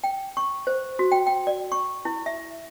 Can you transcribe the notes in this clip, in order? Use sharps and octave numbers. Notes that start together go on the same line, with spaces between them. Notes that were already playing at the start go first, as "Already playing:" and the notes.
G5
C#6
C5
F#4
G5
G5
D5
C#6
E4
E5